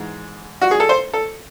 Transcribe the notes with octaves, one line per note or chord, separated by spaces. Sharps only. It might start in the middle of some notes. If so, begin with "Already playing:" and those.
Already playing: G#2 E3 G#3
F#4
G#4
A4
C5
A4